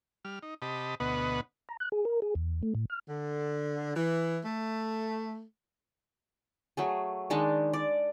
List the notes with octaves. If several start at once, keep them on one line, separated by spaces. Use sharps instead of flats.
G3 F6
D#4
C3 G4 D#5 A5 B5
D2 B2 B3 B4 D#5 F#5
A#5
F#6
G#4
A#4
G#4
E2
A3
A2
F6
D3
E3
A3
F#3 A3 G#4
D#3 G#3 D4
D5